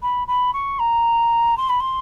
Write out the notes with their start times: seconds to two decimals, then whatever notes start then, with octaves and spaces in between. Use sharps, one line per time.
0.02 B5
0.28 B5
0.53 C#6
0.79 A#5
1.57 C6
1.69 B5
1.80 C6